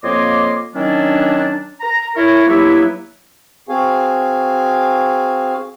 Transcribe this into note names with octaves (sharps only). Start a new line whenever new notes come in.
F2 A#3 C#5 D#5 C6 D6
D#3 F#3 C#4 D4
A#5
E4 A#4 C#5
G2 F#3 A#3 B3 E4
C4 F#4 G#4 F5 G#5